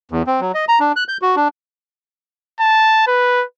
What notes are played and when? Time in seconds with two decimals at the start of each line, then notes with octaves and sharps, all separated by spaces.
0.11 E2
0.27 C4
0.40 F#3
0.54 D#5
0.68 A#5
0.80 D4
0.96 F#6
1.08 G6
1.22 F#4
1.36 D4
2.60 A5
3.07 B4